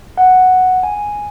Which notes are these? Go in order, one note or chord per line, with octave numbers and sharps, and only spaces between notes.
F#5
G#5